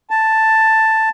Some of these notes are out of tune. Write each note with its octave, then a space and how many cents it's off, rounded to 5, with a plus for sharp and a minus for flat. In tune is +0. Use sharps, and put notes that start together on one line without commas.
A5 +5